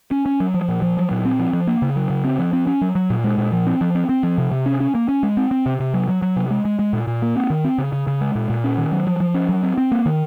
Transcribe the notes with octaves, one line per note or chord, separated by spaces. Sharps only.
C#4
C#4
F#3
F3
A#2
F3
F#3
A#2
C4
F3
F3
A#3
C#3
F#3
C#3
C4
F3
C4
C#4
F#3
F#3
A#2
G#3
A#2
F3
C4
F3
C4
C4
F3
C3
C3
C#4
C#4
A#3
C#4
G#3
C4
C4
C3
C3
F#3
F#3
F#3
C3
G#3
G#3
G#3
A#2
A#2
A#3
C4
D#3
C4
C#3
C#3
C#3
G#3
A#2
A#2
C#4
D#3
F#3
F3
F3
C#4
F#3
C4
C4
A#3
D#3